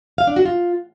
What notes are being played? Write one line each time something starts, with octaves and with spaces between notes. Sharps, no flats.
F5
D4
F#4
F4